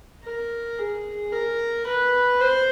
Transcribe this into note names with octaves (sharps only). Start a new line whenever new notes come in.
A#4
G#4
A#4
B4
C5